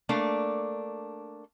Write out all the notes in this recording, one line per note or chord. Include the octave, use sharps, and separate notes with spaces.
A3 A#3 D4